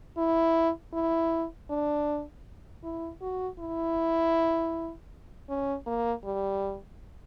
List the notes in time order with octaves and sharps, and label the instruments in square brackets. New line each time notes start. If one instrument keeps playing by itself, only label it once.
[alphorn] E4
E4
D4
E4
F#4
E4
C#4
A#3
G3